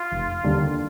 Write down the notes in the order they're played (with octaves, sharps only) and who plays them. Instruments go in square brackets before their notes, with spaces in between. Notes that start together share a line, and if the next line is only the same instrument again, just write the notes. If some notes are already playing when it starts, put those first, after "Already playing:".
Already playing: [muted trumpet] F4
[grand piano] F1
D#2 D3 G3 D4